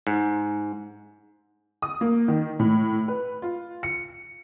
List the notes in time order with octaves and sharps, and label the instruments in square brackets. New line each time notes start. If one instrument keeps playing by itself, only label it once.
[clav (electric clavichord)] G#2
[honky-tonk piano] D#6
A#3
D#3
A2
B4
F4
C#7